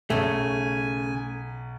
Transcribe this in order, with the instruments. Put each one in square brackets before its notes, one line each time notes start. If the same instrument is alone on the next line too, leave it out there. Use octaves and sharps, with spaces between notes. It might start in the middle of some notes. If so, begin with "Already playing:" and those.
[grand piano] B1 [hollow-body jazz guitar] C#3 A3 [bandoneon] G#5